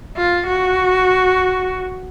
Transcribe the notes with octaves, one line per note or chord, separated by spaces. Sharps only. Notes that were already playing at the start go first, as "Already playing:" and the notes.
F4
F#4